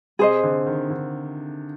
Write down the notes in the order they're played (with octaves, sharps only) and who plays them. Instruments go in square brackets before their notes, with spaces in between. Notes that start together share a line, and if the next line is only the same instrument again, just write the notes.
[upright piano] C3 [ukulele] G#4 C5 D#5
[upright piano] D3
D#3
D3